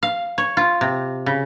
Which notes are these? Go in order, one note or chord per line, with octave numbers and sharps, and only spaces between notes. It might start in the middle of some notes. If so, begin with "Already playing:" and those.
F5
C#5
F4
C3
C#3